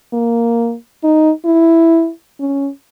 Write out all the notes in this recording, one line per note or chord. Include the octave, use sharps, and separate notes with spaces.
A#3
D#4
E4
C#4